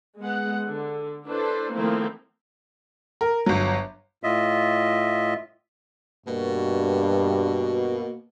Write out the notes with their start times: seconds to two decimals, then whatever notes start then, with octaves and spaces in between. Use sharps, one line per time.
0.20 G#3 B3 F#5
0.65 D3
1.27 D4 E4 A4 B4 C5
1.72 D#3 F3 A3 A#3 C4 E4
3.21 A#4
3.46 G1 F#3
4.23 A2 F4 D#5 E5
6.26 G2 B2 A#3